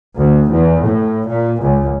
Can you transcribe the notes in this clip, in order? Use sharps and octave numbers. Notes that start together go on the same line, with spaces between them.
D2
E2
A2
A#2
C#2